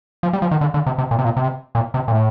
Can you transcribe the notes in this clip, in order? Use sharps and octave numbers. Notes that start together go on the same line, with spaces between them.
F3
G3
F3
D#3
D3
D3
C3
C3
A#2
C3
A#2
C3
A#2
C3
A#2
A2